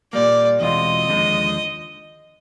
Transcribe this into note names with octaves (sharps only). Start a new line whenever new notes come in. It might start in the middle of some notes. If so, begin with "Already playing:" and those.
A#2 G3 A#3 D5
E2 B2 G#3 C4 F4 D#5
D#2 D3 F3 G#3